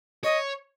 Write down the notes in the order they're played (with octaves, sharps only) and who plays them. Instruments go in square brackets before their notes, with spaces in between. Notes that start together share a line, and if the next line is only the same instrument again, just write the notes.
[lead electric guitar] C#5 [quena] D#5